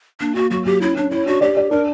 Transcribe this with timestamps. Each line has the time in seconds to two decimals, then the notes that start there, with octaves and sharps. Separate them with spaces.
0.20 A#3 D4
0.35 A#3 F#4
0.50 F#3 F#4
0.65 F#3 G4
0.81 C#4 E4
0.96 C#4 D4
1.11 E4 C#5
1.26 D4 F#4
1.41 G4 D5
1.57 D5
1.71 D4 A#4